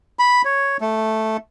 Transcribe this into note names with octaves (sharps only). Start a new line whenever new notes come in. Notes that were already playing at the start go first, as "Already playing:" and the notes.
B5
C#5
A3